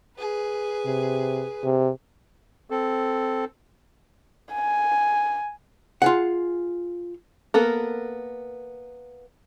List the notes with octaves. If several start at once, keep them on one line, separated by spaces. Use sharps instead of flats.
G#4 B4
C3
C3
C4 A4
G#5
F4 G#4 F#5
A#3 B3 A4 A#4